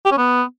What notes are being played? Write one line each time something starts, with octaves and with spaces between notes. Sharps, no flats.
G4
C#4
B3